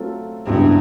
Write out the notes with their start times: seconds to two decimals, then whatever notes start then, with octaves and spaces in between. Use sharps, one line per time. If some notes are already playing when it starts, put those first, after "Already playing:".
Already playing: F#3 A3 C4 F4 A4
0.46 C#2 G2 B2 G#3 C4 E4